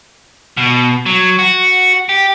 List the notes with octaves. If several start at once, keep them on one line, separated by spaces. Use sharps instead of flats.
B2
F#3
F#4
G4